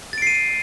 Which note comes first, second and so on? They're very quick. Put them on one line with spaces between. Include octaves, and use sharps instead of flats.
A6 D7 C7 D#7